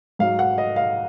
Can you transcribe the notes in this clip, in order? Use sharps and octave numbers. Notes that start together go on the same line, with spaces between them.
G#2 F#3 F5
F#5
D#5
F5